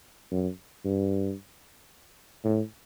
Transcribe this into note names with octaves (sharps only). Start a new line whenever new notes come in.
F#2
G2
A2